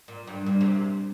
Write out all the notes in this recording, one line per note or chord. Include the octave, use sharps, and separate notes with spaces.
A#2
G2
A#2
C3